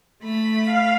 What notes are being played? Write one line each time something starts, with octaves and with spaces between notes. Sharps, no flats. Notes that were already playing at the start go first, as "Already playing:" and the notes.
A3 B5
F5